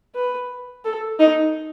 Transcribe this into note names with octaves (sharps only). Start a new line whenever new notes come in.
B4
A4
D#4